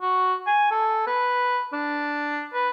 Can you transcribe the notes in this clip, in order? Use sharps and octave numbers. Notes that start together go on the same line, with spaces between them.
F#4
G#5
A4
B4
D4
B4